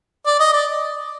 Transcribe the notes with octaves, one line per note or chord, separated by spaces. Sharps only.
D5
D#5
D5